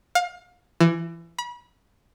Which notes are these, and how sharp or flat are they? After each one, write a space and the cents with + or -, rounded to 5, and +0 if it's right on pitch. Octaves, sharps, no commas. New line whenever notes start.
F5 +30
E3 +25
B5 -35